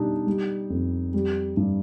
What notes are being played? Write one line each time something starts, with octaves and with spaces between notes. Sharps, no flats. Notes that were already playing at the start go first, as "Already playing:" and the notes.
Already playing: B2 G3 D4 D#4
G3
F2
G3
G2